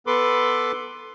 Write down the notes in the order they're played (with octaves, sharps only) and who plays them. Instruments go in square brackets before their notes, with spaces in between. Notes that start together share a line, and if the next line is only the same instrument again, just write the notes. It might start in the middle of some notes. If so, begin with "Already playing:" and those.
[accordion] B3 A4 B4 B5 C6 D6